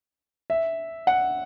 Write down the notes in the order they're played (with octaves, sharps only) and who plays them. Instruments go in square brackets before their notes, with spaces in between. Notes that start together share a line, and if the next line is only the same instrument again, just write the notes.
[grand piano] E5
F#5